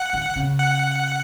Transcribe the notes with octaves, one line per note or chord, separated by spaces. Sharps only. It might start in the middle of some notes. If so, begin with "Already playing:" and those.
Already playing: F#5
D#3
C#3
F#5